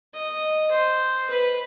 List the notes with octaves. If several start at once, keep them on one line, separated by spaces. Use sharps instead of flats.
D#5
C5
B4